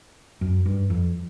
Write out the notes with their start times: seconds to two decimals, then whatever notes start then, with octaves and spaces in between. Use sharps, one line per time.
0.41 F#2
0.66 G2
0.90 F2